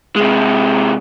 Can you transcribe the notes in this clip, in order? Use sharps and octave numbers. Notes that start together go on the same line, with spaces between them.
C3 G#3